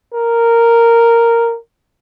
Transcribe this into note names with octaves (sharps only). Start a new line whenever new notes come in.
A#4